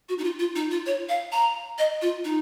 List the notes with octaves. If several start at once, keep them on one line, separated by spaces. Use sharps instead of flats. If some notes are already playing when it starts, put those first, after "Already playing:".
F#4
D#4
F4
F4
D#4
F4
C#5
F5
A#5
D#5
F4
D#4